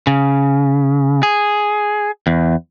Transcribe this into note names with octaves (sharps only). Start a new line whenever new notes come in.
C#3
G#4
E2